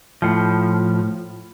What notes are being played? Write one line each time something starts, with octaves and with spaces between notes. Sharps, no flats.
A2 F3